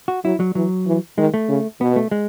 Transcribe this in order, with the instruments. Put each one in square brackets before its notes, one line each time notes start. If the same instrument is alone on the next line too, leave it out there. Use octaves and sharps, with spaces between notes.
[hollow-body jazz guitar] F#4
[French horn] F#3 [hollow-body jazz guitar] E4
[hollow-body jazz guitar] F#3
[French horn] E3 [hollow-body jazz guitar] F#3
[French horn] E3
[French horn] D#3 [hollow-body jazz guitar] G#3
[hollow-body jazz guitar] A3
[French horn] C#3
[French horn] B2 [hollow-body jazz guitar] B3
[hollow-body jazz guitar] A3
G#3